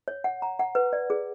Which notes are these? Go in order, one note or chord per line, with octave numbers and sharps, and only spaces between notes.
C#5
F#5
A#5
F#5
B4
D5
G#4